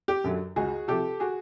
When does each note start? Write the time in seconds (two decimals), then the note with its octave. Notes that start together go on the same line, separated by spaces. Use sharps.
0.08 G4
0.24 F#2 D3 F#3
0.56 C#2 F#4 G#4
0.88 C3 F3 G4 A4
1.20 F#4 G#4